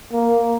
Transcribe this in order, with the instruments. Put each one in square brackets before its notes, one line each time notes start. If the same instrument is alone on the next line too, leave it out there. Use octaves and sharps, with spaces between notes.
[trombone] A#3